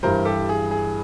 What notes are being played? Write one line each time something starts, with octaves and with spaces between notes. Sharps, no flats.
G2 E3 G3 A#4 C5
G4 A4
G#4
G#4